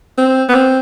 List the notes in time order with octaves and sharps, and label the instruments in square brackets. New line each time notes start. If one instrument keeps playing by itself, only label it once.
[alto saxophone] C4
B3
C4